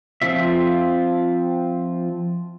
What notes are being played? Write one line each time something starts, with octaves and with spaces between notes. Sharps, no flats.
F3 C4 F4 E5